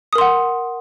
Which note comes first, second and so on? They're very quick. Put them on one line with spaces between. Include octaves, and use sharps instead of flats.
D#6 A#4 C6 F#5